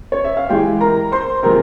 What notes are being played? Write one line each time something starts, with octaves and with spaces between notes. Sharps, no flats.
C#5
E5
F5
E3 G#3 G4 G5
A#4 A#5
C5 C6
C3 F3 G#3 A#4 A#5